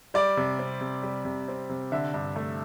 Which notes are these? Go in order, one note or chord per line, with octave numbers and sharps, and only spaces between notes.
G3 D5
C3
C4
C3
G3
C3
C4
C3
D3 E5
G2
A3